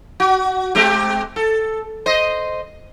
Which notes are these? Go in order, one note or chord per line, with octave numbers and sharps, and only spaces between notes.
F#4
G#3 C4 G4
A4
C5 D#5